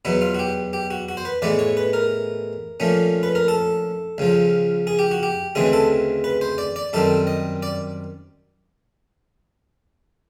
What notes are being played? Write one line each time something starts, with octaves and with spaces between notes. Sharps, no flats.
E2 B2 F#3 B3 E4
F4
F#4
G4
G4
F#4
F#4
C5
B4
A2 E3 G#3 B3 D5
C#5
B4
A#4
A#2 F3 A3 C#4
B4
A#4
A4
C#2 C#3 F3
G#4
G4
F#4
G4
D2 C#3 E3 G#3 C4 G#4
A4
B4
C5
D5
D5
F#2 D#3 G3 C4 A4
D#5
D5